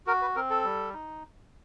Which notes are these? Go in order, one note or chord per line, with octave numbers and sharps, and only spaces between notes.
F#4 A#4
B4
C4 A#4
A4
G3
D#4